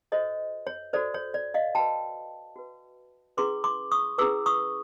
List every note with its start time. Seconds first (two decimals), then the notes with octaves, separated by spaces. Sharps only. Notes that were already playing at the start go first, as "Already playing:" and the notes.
0.12 F#4 A4 C5 C#5 D#5
0.67 C#5
0.93 F#4 A4 C5 D5
1.14 C#5
1.34 D5
1.54 D#5 F5
1.75 F#4 B4 G5 A5
2.56 F#4 B4
3.37 C#4 E4 G#4 B4 C6 D6
3.64 C6 D6
3.92 C#6 D#6
4.18 C#4 E4 G#4 B4 D6 E6
4.46 C#6 D#6